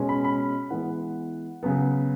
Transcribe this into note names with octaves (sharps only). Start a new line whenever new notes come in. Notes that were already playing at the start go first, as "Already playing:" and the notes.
Already playing: B2 G#3 C#4
B5
B5
E3 G#3 B3 F#5
C#3 F#3 B3